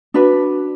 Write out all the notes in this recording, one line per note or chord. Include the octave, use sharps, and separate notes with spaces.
D4 F#4 B4